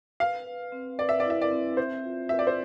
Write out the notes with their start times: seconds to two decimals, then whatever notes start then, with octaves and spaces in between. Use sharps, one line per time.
0.20 B4 F5
0.47 B4
0.72 C4
0.99 B4 D5
1.09 E5
1.20 E4 D5
1.30 E5
1.42 D5
1.51 C4
1.77 C5 E5
2.04 F4
2.29 B4 E5
2.39 D5
2.47 C5